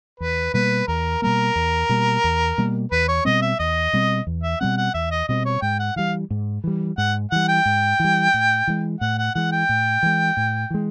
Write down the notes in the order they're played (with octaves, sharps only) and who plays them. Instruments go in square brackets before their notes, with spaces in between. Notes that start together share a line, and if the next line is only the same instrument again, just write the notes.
[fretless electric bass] E2 [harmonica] B4
[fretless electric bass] B2 G3 A#3 [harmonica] B4
[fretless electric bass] E2 [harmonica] A#4
[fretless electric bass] B2 G3 A#3 [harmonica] A#4
[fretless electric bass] E2
B2 G3 A#3
E2
B2 G3 A#3
[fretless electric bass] E2 [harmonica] B4
[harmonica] C#5
[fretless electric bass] B2 G3 C4 [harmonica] D#5
[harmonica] E5
[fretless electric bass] E2 [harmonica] D#5
[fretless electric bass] B2 G3 C4
E2
[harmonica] E5
[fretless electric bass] B2 G3 C4 [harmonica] F#5
[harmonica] F#5
[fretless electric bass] E2 [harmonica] E5
[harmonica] D#5
[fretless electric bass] B2 G3 C4 [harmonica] D#5
[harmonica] C#5
[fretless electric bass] G#2 [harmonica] G5
[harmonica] F#5
[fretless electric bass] E3 G3 [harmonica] F5
[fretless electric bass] G#2
E3 G3
[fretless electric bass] G#2 [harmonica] F#5
[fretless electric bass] E3 G3 [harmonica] F#5
[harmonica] G5
[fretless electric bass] G#2
E3 G3
A2
E3 G#3
[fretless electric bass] A2 [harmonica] F#5
[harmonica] F#5
[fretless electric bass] E3 G#3 [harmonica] F#5
[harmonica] G5
[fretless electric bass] A2
E3 G#3
A2
E3 G#3